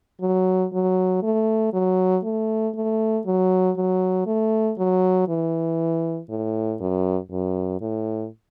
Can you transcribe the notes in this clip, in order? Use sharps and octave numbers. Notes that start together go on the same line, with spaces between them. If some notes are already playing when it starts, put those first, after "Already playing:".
F#3
F#3
A3
F#3
A3
A3
F#3
F#3
A3
F#3
E3
A2
F#2
F#2
A2